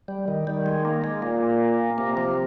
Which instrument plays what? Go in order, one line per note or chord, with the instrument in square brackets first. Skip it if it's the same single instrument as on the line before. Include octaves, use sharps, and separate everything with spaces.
[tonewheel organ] G3
D#3
[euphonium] D#3 [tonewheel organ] G3
[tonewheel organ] G#3
A#3
G#3
[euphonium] A#2 [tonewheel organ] A#3
[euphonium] C3 [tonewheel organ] A#3
[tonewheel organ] F3